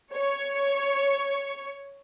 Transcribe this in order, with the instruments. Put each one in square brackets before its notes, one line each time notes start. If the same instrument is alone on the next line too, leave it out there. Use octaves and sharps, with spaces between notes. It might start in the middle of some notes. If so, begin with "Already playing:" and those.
[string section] C#5 C#6